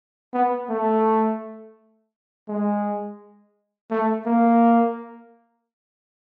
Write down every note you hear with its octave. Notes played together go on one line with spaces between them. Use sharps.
B3
A3
G#3
A3
A#3